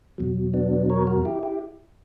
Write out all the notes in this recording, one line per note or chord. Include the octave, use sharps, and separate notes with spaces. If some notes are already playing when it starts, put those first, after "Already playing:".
E2 B2 F#3
B3 D4
A#4 C#5
F#4 A#4
E4 G4
E4 G4